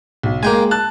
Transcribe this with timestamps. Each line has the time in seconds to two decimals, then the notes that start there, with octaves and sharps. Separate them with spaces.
0.23 B1
0.43 G#3 A#3 G5 G#5
0.71 A5 F#6